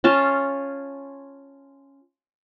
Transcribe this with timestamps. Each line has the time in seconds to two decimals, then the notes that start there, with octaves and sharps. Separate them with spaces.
0.04 C#4 F4 A5